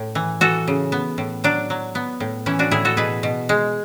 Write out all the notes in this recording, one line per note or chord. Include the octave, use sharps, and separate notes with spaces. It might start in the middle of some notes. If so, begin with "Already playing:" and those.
Already playing: A2
E3
E3 F#4 A4
C#3
B3
A2
F#3 D4
F#3
B3
A2
E3 C#4 E4
D4 F#4
A2 E4 G#4
F#4 A4
B2 G#4 B4
B2
G#3